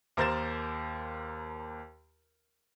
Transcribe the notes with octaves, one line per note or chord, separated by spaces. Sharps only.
D#2 A#4 C5 G6 A6 E7